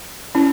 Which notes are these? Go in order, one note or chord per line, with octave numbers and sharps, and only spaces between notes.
C#4 E4